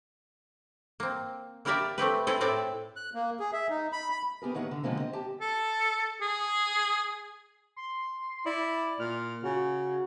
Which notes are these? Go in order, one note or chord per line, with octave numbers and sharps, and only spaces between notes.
A#3 C4
A#3 E4 G4 A#4 D5 E5
A3 C4 G4 B4
C4 E4 G#4 A4
A2 C4 D5 E5
F#6
A#3
G#4
E5
D#4
B5
B5
B3 G4 G#4 A#4
A2 D#3 D#4 C#5 F#5
D3
B2 D3 F3 G#3 A#3 C4
C4 D#5
G4 A5
A4
G#4
C6
E4 D5
A#2 F6
C#3 F#4